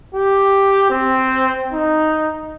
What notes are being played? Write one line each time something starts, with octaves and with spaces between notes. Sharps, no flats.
G4
C4
D#4